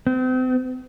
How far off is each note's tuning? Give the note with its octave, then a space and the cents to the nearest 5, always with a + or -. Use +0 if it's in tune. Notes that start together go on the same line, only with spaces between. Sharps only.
C4 -40